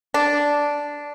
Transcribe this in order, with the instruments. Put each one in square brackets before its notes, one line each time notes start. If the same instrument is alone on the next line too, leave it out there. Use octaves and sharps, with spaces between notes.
[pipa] D4